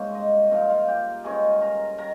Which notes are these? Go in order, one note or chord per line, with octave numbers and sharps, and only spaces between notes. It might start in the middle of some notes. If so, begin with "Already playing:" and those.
Already playing: G#2 G3 A#3 C4 C#4 C5
D#4 D#5
A#2 F3 C4 D#4 F5
D#5
F4 F5
G4 G5
G2 D#3 G#3 C#4 G#4 G#5
A#4 A#5
D#3 A#4 A#5